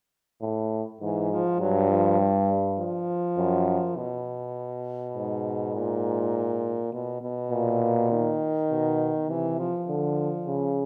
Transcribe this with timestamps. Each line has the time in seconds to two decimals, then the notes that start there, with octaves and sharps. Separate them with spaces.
0.42 A2
1.01 G#2 E3
1.30 F3
1.60 G2 F#3
1.90 F3
2.19 G3
2.79 F3
3.37 F#2
3.97 B2
5.15 G#2
5.74 A#2
6.93 B2
7.22 B2
7.51 A#2
8.11 D#3
8.71 B2
9.29 C3 E3
9.59 F3
9.88 D3
10.47 C#3